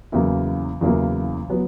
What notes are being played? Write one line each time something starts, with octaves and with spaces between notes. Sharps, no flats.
E2 C#3 F#3 A#3 E4
E2 C#3 F#3 A#3 E4
F#3 B3